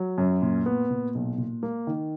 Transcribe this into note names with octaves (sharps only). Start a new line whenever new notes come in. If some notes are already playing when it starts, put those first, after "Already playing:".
Already playing: F#3
F#2
A#2
B3
A#2
B1
A#2
A#3
D#3